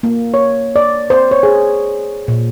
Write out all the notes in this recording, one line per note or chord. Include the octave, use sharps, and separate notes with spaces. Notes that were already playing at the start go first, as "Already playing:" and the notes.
A#3
C#5
D5
C5
C#5
G#4
A#2